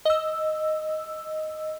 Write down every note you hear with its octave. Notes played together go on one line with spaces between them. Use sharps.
D#5 E6